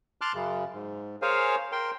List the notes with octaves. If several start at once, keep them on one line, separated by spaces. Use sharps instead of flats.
A5 C6 D6 F6 F#6
F#2 C#3
G#2
G#4 A#4 C5 C#5 F5 G#5
A#4 G5 C6